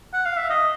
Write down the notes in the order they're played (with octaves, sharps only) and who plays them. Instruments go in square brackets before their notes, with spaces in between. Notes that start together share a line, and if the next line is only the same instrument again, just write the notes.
[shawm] F#5
F5
E5
D#5